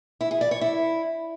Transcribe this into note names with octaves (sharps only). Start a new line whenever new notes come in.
E4
G#4
D5
C#5
E4